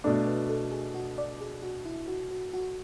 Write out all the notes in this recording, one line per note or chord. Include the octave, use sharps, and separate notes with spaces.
B2 A3 D4 D5
B4
A4
G#4
F#4
D5
G#4
F#4
E4
F#4
F#4
F#4